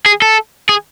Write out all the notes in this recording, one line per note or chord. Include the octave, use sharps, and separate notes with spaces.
G#4
A4
G#4